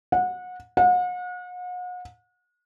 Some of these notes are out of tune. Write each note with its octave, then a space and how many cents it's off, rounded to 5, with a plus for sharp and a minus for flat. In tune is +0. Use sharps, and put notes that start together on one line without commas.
F#5 -25
F#5 -40